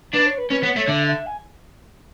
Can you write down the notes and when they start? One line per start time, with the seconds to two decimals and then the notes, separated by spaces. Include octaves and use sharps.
0.13 D4 B4
0.26 C#5
0.38 B4
0.50 C#4 B4
0.63 B3 C#5
0.75 A3 C#5
0.88 D3 E5
1.07 E5
1.26 G#5